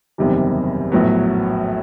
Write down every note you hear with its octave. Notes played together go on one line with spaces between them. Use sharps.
F#1 E2 C3 D#3 G3
A#1 A2 F#3 B3